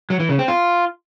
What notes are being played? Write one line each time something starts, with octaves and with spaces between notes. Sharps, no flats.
F#3
E3
C#3
C4
F4